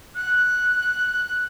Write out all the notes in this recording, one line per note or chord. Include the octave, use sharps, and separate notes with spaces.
F#6